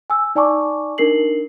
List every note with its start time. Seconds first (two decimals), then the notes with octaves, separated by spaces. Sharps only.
0.10 G#5 E6
0.35 D#4 D5 G#5 A5 C#6 D6
0.98 D4 D#4 A#4 C7 F#7